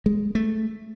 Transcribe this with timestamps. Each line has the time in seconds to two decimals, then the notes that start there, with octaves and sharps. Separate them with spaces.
0.06 G#3
0.35 A3